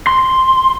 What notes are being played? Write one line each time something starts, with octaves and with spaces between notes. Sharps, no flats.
C6